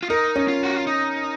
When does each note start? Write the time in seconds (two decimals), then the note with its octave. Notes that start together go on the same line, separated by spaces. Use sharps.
0.03 F4
0.10 D#4 A#4
0.36 C#4
0.48 F4
0.63 F#4
0.75 F4
0.87 D#4